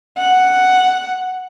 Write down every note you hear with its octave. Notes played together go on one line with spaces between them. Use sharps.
F#5